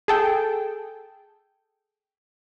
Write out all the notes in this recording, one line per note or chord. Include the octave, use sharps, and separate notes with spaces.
G#4 A4 G5